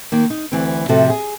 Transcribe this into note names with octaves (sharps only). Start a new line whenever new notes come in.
D#3 A#3
D#4
D2 E3 C4
A2 C3 F3 F#4 A4
G#4